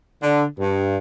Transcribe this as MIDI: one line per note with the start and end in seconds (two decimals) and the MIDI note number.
0.23 0.44 50
0.59 0.98 43